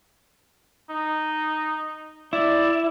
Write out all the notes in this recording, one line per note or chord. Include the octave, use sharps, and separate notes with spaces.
D#4
E4 D5